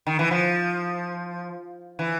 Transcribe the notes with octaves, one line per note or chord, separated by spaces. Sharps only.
D#3
E3
F3
E3